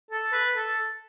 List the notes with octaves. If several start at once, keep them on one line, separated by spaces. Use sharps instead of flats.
A4
B4
A4